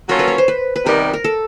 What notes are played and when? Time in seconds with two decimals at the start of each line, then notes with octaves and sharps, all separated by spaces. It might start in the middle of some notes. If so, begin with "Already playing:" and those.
0.09 F#3 A#3 C#4 F4 A4 A#4
0.19 B4
0.28 C#5
0.38 C5
0.48 B4
0.76 B4
0.86 C3 D#3 G3 B3 D#4 A#4
1.13 A#4
1.24 A4